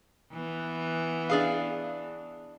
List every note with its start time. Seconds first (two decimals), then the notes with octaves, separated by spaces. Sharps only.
0.32 E3 B3
1.30 D4 G#4 F5